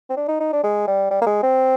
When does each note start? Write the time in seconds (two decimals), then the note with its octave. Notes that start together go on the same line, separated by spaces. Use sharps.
0.10 C4
0.17 D4
0.28 D#4
0.40 D#4
0.53 D4
0.63 G#3
0.87 G3
1.11 G3
1.22 A#3
1.26 G#3
1.43 C4